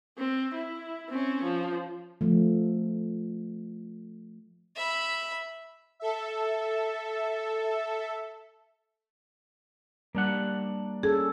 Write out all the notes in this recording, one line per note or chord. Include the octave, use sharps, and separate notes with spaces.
C4
E4
C4 C#4
F3
F3 A3
E5 B5
A4 E5
G3 A#3 D4 F#5
C#4 G#4 A4